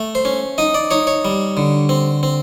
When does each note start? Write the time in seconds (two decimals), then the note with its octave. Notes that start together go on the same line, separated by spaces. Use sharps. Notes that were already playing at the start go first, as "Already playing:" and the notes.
Already playing: A3
0.15 C5
0.25 C#4
0.58 D#4 D#5
0.74 D5
0.91 D#4 C#5
1.07 C#5
1.25 G3
1.57 D3
1.89 C4
2.23 C4